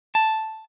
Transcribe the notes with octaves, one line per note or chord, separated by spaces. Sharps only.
A5